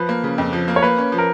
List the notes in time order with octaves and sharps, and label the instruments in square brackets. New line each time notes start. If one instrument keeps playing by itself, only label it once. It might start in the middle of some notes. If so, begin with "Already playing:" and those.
Already playing: [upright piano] F3 [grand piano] B4
[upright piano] A#3
C#3
F2
F3
A#3
[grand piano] C#5
[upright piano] A#3 [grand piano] B4
[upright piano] C#4
F3
[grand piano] A#4